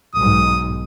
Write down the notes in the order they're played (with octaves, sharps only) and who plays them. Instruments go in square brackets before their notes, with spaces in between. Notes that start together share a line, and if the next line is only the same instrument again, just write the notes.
[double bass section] B1 G#2 [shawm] D#6